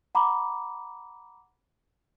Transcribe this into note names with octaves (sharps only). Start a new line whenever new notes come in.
F#5 A#5 B5 D6